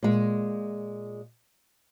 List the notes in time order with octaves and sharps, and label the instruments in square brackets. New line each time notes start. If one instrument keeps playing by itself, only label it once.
[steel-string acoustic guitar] A#2 G#3